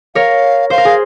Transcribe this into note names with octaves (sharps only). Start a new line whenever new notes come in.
A#4 C#5 F5
C5 F5
A#4
G#4